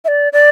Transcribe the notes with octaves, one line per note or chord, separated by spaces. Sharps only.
E5
D5
D5